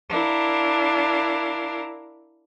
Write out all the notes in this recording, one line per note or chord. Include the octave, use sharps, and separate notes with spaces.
D4 E4 A#4 F5